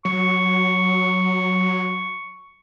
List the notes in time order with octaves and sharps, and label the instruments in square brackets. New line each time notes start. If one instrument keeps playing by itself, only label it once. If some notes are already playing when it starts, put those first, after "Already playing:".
[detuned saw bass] F#3 [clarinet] C#6